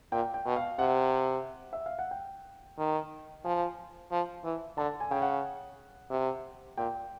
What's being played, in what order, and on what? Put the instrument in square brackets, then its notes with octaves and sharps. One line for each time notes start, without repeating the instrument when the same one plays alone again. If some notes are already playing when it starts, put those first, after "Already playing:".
[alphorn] A#2 [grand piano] G5
[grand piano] G5
[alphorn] B2
[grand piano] F5
[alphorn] C3 [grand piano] F#5
[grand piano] E5
F5
F#5
G5
[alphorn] D#3
[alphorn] F3 [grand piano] G#5
[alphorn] F3
E3
[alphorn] D3 [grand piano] A5
[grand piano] G#5
[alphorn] C#3 [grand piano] G5
[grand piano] F#5
[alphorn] C3
[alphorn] A#2 [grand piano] G5